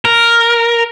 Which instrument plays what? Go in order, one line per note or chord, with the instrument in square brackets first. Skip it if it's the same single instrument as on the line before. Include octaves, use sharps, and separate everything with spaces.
[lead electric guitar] A#4